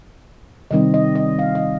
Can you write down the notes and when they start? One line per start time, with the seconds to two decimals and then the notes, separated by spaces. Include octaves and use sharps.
0.71 C3 D#3 G3 C4 D#4 D#5
0.94 D#5
1.15 D#5
1.39 F5
1.55 D#5